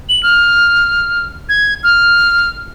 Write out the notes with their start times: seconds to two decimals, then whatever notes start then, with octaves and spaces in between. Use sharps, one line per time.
0.09 F#7
0.23 F6
1.49 G#6
1.83 F6